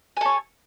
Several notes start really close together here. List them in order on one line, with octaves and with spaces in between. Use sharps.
G#5 A4 C#5